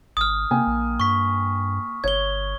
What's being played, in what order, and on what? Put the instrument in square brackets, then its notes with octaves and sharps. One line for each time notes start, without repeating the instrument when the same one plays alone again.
[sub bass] G#1 [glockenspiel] D#6 F6
[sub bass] C3 [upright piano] A#3 G5 G#5
[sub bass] A#1
[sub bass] G2 [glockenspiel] C#6 B6
[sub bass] G1 [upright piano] C#5 [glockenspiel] G#6 G7